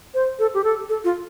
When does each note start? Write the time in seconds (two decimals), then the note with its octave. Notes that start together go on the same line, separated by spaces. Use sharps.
0.14 C5
0.39 A4
0.54 G4
0.64 A4
0.89 A4
1.04 F4